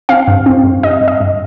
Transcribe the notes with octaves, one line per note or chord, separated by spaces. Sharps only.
C4 F5
G2
C4
G2
G2 D#5
G2
D#5
G2